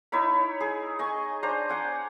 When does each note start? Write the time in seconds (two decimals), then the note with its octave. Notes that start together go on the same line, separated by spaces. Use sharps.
0.12 D#4 E4 C#5 B5
0.60 G#4
0.99 D#5 G#5 C#6
1.43 D4 C5 A#5
1.69 D5 F#5 G#5